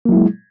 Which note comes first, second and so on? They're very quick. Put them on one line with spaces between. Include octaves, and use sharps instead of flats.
A#3 F#3 E4 G#3